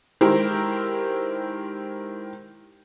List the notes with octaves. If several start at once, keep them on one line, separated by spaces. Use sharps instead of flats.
D#3 G#3 E4 G4 A#4 C5